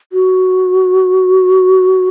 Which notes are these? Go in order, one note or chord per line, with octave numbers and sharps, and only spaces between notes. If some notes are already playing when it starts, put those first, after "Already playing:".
F#4